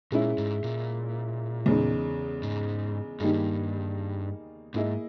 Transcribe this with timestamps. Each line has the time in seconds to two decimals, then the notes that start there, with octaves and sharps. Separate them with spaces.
0.12 A#2 G#3 C#4 E4
0.38 G#2
0.64 A#2
1.66 E2 C#3 G#3 D#4
2.43 G#2
3.20 G2 D#3 G3 A#3 D#4 G#4
4.74 G#2 A#3 E4 G#4 D#5